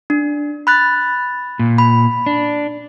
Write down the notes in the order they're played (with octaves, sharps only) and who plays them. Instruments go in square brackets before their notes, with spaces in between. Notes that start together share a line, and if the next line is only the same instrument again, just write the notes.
[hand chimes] D4
B5 F#6 A6
[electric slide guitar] A#2
[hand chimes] B5
[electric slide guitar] D4